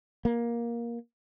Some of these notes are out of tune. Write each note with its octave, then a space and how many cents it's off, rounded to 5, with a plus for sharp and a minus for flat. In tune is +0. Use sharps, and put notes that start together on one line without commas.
A#3 +15